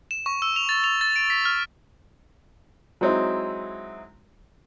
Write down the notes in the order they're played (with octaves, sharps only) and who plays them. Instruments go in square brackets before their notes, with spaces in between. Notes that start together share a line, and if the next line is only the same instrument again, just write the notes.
[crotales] E7
C#6
E6
F7
A6
F7
A6
D7
B6
F6
[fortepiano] F#3 G#3 C4 D#4 E4